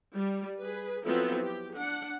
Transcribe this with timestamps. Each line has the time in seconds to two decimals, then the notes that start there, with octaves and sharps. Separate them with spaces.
0.16 G3
0.60 G#4 B4
1.06 F3 F#3 B3 C4 E4 A4
1.43 G4
1.76 D4 F#5